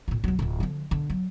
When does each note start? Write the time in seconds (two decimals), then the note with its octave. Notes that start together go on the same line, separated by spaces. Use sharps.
0.08 A2 F4
0.24 C#2 F#3
0.39 D1 F4
0.60 D3 F3
0.91 D3
1.10 F#3